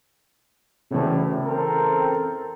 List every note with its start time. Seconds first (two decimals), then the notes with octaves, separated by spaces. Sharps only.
0.91 D2 A2 C#3 E3
1.45 C4 A4 A#4